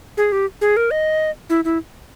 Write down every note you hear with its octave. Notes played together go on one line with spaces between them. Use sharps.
G#4
G4
G#4
A#4
D#5
E4
E4